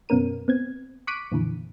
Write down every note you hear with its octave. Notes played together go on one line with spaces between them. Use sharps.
F#2 B2 B3 C#4 A#4 D#7
B3 C4 G#6
C#6 D6 F#6 B6 D7 D#7
F2 A#2 D3 E3